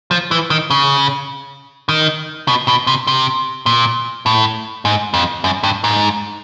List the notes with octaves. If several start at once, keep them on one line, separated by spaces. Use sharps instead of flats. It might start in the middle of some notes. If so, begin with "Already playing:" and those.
F3
E3
D#3
C#3
D#3
B2
B2
C3
C3
A#2
A2
G#2
F2
F#2
G2
G#2